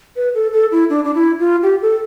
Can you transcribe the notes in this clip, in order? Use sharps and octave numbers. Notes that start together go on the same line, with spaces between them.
B4
A4
A4
E4
D4
D4
E4
F4
G4
A4